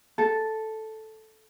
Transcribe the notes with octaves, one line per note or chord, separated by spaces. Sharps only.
A4